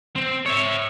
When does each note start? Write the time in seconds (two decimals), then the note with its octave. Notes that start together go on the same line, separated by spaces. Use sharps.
0.16 C4
0.46 C#5 E5